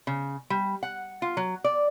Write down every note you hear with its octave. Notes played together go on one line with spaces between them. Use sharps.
C#3
G3
F#5
F4
F#3
D5